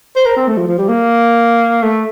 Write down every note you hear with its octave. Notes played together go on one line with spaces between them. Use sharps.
C5
A#4
C4
A3
F3
F3
G3
A#3
A3